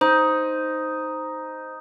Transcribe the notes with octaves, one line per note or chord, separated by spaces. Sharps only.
D#4 C5